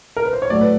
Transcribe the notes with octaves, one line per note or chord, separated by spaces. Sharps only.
A#4
B4
C5
C#5
A2 F#3 A3 D5
B4